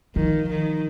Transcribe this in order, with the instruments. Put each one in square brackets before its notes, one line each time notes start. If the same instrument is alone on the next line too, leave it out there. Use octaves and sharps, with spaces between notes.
[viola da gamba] D#3 [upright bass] F3
[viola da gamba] D#3